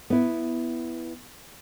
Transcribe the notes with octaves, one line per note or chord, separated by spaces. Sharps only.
B3 E4